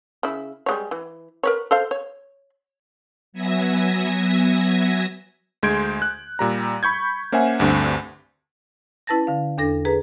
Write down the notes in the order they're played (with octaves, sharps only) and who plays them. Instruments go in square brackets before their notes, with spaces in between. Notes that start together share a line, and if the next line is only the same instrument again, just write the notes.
[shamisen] C#3 E4
G3 G#3 C#5
E3
A#4 B4 C#5
A4 C5 F5
C#5
[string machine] F#3 B3 E5 G#5 A#6
[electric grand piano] D2 G#3 C6 G6 G#6 D7
F#6
A#2 G3 A#5
B5 C#6 G6 G#6
A#3 C#4 C5 E5 F#5 G#5
D2 G2 D3 C4
[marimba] C#4 E4 B4 A5 A6 A#6
D3 F5
E2 D4 A4 A#6
G#4 B4 A#5